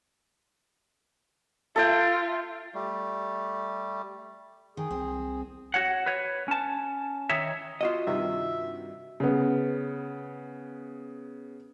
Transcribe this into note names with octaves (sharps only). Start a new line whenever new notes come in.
F4 A4 E5 G5
G3 A3
D#3 G#4
C2 C4
F#4 C#5 F#5
B4 C#5
C#4 A5
D#3 D#4 C#5 E5
F4 F#4 D#5
G2 C3 D#3 E5
C#3 B3